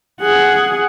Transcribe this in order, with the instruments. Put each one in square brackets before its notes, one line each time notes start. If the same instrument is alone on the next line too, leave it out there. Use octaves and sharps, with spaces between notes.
[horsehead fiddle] G#4 F#5